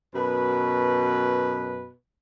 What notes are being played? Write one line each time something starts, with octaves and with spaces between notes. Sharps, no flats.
F#2 B2 B4